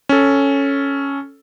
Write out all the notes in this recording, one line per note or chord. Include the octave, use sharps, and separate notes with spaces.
C#4 A4